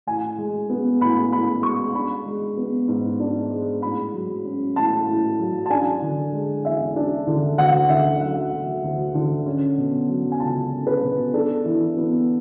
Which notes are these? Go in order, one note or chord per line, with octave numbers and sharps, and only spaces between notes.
A2 G#5
G#3
B3
A2 B5
A2 B5
G#3 C#6
D4 B5
G#3
B3
G#2
D4
G#3
A2 B5
F#3
C#4
A2 A5
A2
F#3
A5
D4 G#5
D3
G#3
E2 E5
D4
D3
D2 F#5
D3 E5
F#3 F#5
D2
D2
D3
C#4
B2
F#3
G#5
C#2 A5
C#4
B4
B2
D4 A4
E3
B3